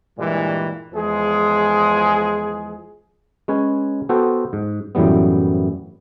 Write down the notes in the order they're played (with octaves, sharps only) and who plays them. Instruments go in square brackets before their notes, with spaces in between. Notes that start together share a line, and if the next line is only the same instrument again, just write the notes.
[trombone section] G2 A#2 E3 G3 G#3
E2 F3 G#3 G#4
[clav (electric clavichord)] G#3 C#4 B4 C#5 G#5
B3 F#4 A4 C5 G5
G#2
F#2 A2 E3 G3 B3